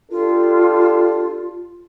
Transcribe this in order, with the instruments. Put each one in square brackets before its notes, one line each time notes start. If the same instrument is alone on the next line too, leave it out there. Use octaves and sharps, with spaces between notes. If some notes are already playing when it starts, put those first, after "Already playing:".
[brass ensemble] D4 G4 A4 [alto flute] F4